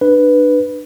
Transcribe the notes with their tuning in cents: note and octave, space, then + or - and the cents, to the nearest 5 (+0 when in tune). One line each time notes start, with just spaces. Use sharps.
D4 +30 B4 +0